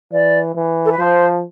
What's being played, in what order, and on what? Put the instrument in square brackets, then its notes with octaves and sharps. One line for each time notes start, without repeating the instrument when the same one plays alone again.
[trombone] E3 [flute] D5
[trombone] E3
[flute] A4
B4
[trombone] F3 [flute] C5